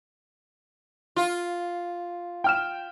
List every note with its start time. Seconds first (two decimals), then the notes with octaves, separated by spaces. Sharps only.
1.16 F4
2.44 G5 F6 E7